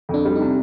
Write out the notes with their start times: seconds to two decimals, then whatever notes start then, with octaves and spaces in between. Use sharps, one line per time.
0.09 F2
0.14 D4
0.25 G3
0.36 D#4
0.41 C3